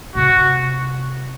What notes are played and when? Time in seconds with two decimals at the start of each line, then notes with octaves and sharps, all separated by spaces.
0.15 C3 F#4